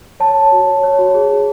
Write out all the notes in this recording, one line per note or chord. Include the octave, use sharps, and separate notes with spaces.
C#5 A5
C#5
F#4
C#5
C#5
F#4
G#4
G#4